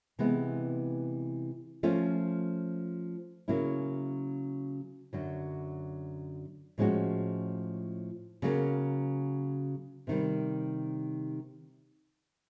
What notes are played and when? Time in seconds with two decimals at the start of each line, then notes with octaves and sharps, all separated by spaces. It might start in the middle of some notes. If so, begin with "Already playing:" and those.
0.19 C3 E3 G#3 B3
1.83 F3 A3 C#4 F4
3.48 C#3 F#3 A#3 C#4 E4
5.13 F#2 D3 F#3
6.78 A2 F3 G#3 C#4 F#4
8.42 C#3 F#3 A#3
10.07 C3 D#3 G3